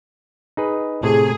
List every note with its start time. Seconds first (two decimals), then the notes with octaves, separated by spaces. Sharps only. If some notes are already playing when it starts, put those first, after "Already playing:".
0.57 D#4 G#4 B4
1.03 A2 C3 G#4